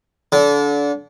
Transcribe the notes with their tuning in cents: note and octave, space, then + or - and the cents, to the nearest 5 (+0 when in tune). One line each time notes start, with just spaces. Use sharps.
D3 -30